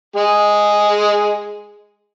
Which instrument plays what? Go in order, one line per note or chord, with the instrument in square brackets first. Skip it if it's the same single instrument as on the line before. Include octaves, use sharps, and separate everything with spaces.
[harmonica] G#3 G#4